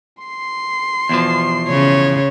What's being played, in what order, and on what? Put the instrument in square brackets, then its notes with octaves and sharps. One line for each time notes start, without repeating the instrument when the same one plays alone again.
[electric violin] C6 C7
[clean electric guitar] E2 B2 F3
[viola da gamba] C#3 C#5